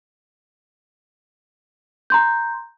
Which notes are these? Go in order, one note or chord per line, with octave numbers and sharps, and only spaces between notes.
A#5 C6 G6